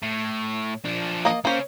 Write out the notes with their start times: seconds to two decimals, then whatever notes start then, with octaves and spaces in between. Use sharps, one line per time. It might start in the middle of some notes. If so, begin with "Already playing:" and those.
0.03 A2
0.85 F3 D4
1.25 A#3 D#5
1.45 C#3 A#3 C#4 C5